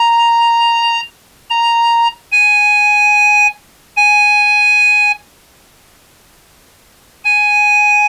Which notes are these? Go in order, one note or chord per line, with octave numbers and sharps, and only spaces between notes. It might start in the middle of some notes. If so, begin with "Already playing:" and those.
Already playing: A#5
A#5
G#5
G#5
G#5